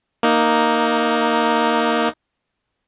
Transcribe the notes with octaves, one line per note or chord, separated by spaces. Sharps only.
A#3 D#4